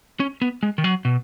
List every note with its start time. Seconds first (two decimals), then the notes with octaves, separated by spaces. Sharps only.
0.20 C#4
0.42 B3
0.63 G#3
0.78 D#3
0.84 F#3
1.05 B2